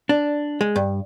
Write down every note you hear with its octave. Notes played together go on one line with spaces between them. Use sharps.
D4
G#3
G2